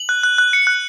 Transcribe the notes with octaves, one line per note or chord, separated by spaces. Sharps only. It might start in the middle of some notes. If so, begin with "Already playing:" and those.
Already playing: F#7
F#6
F#6
F#6
C#7
F#6